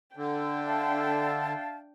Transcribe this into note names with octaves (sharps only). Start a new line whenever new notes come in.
D3 D4 G5
E5 F5 A5